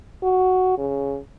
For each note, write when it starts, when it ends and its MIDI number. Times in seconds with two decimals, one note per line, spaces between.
0.23 0.77 66
0.78 1.18 49